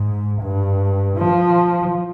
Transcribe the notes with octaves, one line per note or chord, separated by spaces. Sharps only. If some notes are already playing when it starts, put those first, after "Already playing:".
Already playing: G#2
G2
F3